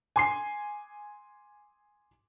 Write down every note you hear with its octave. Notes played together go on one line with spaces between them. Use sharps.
G#5 C6 C7